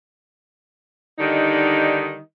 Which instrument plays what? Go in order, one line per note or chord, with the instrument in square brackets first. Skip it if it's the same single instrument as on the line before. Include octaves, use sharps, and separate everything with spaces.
[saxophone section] D3 D#3 G3 D#4